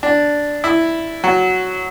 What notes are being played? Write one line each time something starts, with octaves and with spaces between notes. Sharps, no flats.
D4
E4
F#3